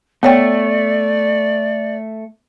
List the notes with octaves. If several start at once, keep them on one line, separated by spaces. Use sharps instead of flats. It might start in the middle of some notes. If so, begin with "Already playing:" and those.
A3 B3 C#5 D5 G5